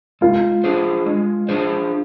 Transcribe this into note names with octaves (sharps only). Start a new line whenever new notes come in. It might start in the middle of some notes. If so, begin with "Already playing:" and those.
G#3 F4
D4 G#4 C5
G#3
D4 G#4 C5